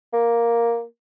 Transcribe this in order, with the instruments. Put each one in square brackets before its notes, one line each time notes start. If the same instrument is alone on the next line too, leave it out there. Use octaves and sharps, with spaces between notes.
[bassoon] A#3